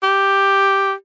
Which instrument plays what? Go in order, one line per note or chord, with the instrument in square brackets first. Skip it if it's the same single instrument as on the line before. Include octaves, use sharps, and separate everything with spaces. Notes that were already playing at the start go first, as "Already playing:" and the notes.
[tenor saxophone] G4